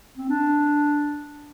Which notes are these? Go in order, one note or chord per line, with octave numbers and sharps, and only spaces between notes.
C4
D4